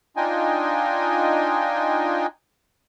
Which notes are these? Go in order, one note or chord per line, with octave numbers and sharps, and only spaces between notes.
D4 D#4 F4 D#5 G5 G#5